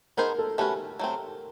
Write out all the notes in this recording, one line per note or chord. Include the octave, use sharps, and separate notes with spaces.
B3 D#4 G#4 A#4 C5
A4
A3 C#4 F#4 G4 B4
F#3 A3 C4